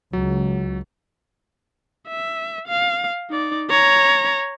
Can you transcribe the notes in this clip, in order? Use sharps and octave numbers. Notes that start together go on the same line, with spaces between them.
C#2 F#3
E5
F5
D#4 D5
C#5 A#5